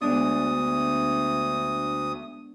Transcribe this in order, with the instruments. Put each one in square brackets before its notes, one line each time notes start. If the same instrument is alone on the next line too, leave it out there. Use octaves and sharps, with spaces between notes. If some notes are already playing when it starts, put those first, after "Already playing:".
[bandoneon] D2 D#6 [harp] G#3 B3 D4